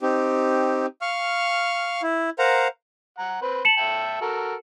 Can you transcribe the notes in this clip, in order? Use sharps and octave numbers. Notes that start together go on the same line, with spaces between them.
C4 D#4 G4
F5 C#6 F6
E4
A#4 C5 F5 F#5 A#5
F#5 A#5
C4 B4 C5
A5 C#7 E7 F#7
E5 G5 A5
F#4 A4 A#4